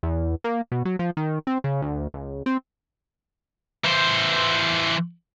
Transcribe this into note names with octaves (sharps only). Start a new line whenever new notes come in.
E2
A#3
B2
F#3
F3
D#3
C4
C#3
D2
C#2
C4
E3 C5